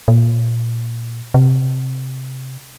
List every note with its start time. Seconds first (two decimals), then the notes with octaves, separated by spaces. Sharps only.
0.08 A#2
1.34 C3